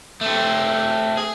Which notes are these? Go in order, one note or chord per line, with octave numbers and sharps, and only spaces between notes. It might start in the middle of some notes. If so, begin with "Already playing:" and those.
A3 C4
G#4